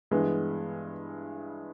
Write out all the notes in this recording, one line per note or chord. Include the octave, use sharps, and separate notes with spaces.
G2 E3 G#3 B3